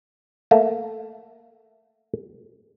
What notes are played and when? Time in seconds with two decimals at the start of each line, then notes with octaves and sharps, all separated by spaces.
0.51 A3 A#3